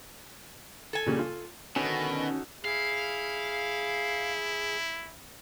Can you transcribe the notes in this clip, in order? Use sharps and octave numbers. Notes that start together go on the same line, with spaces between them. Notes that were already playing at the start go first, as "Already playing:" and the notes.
A4 G#5
A#2 C#3 G3
F4
B2 D3 D#3 C#4 D#4 F#4 A4
E4 G#4 F5